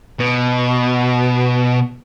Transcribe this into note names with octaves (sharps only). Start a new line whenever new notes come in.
B2